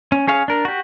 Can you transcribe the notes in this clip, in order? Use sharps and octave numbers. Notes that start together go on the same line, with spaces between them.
C#4
C#4 G#4 C#5 F5
D4 A#4
F#4 G4